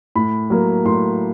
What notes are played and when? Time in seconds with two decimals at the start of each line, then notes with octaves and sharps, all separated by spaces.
0.15 A2 B5
0.50 F#3 A#3
0.85 A2 C6